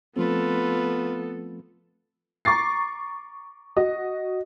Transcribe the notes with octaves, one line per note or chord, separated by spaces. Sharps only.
F3 A3 B3 C4 F4 A4 B4
A#5 C#6 D6 A6 C7
F#4 D#5